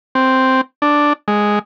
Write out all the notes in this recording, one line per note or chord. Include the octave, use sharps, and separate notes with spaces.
C4
D4
G#3